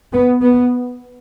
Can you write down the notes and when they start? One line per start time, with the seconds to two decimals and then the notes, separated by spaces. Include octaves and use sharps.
0.14 B3
0.41 B3